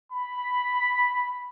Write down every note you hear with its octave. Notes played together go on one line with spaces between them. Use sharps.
B5